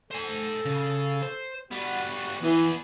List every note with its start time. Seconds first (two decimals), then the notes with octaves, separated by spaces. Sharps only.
0.11 A4 C5 G#5
0.66 C#3
1.22 C5
1.71 G3 B3 F#4
2.43 E3 B3 G#4